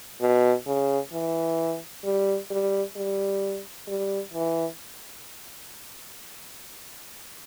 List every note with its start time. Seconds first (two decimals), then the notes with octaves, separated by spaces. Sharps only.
0.21 B2
0.66 C#3
1.13 E3
2.04 G3
2.50 G3
2.96 G3
3.87 G3
4.34 E3